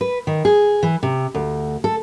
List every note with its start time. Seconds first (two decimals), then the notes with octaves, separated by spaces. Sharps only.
0.01 B4
0.27 D#3
0.45 G#4
0.83 E3
1.03 C3
1.35 D2
1.84 A4